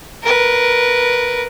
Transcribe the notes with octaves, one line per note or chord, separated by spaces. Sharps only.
A#4 B4